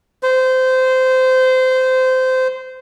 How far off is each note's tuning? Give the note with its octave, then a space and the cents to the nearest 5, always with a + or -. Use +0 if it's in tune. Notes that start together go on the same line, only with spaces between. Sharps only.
C5 -20